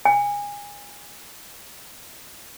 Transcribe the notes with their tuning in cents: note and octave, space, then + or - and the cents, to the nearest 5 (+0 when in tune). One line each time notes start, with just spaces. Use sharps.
G#5 -25